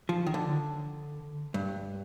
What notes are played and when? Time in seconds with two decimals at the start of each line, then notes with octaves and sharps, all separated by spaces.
0.09 F3
0.26 D#3
0.34 D3
1.54 G2